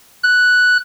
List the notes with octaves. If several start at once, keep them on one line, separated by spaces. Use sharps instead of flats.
F#6